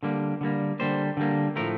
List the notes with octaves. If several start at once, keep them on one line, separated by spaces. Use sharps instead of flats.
D3 G3 A#3
D3 G3 A#3
D3 G3 A#3 C5
D3 G3 A#3
A2 F3 A3 A#4